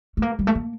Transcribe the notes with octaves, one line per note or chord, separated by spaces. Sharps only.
A3
A#3
G3
A3
A#3